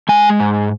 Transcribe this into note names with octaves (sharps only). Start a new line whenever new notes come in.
G#3 G#5
G#2